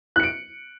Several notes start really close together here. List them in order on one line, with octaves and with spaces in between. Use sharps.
F#6 C#7 D7